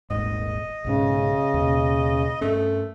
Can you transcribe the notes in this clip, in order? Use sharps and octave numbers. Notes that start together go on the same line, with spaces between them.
D#1 G#1 G#2 D#5
B1 G#2 C#3 C#4
D#2 B2
G2 A3 C#4